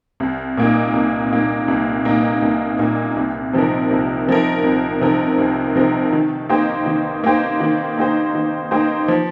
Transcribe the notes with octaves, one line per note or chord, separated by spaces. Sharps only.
C2
A#2 A#3 D#4
C2
A#2 A#3 D#4
C2
A#2 A#3 D#4
C2
A#2 A#3 D#4
C2
C3 F3 D#4 A#4
C2
C3 F3 D#4 A#4
C2
C3 F3 D#4 A#4
C2
C3 F3 D#4 A#4
D#3
A#3 D#4 G4 C5
D#3
A#3 D#4 G4 C5
D#3
A#3 D#4 G4 C5
D#3
A#3 D#4 G4 C5
F3